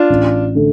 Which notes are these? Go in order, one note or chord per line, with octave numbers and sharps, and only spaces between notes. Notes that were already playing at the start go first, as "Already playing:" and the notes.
Already playing: D4 F4
A1
D3 A3